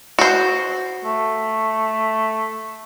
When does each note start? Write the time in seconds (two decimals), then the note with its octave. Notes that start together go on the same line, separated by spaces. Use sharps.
0.19 F#4 C5
1.05 A3